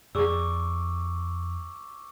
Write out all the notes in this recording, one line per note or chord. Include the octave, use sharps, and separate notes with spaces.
F2 G#4 D5 C#6 D6 E6